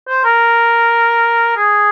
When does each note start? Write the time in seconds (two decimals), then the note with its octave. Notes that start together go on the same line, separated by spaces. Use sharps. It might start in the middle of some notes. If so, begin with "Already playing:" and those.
0.08 C5
0.24 A#4
1.57 G#4